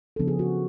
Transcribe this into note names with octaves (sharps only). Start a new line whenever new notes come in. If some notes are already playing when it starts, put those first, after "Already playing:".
C#3 F3 B3 D4 A4
G#4
F#4